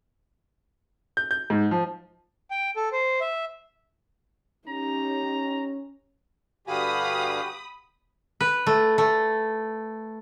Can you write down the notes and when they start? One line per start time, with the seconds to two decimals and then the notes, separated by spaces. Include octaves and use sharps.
1.17 G6
1.31 G6
1.50 G#2
1.71 F3
2.51 G5
2.76 A4
2.92 C5
3.21 E5
4.68 C#4 D#4 G4 A#5
6.67 G2 D3 F#4 G4 F5 G#5 B5 D#6
8.41 B4
8.67 A3
8.98 A3